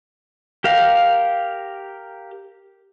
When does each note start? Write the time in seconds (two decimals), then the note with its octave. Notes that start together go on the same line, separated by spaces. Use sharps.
0.64 G4 A#4 F5